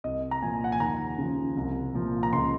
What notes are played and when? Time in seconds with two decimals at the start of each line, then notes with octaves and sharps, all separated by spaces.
0.04 C2 D#5
0.31 A#5
0.42 A#2 F3 G#5
0.64 F#5
0.72 G#5
0.80 D#2 A#5
1.18 C#3 F3
1.57 C2
1.94 A#2 F3
2.23 A#5
2.33 C#2 C6